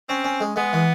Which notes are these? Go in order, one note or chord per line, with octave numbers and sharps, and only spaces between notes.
C4 C#4
C#4
G#3
G#3 B3
E3